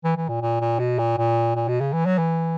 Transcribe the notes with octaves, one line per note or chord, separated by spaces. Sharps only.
E3
E3
A#2
A#2
A#2
B2
A#2
A#2
A#2
B2
C#3
E3
F#3
E3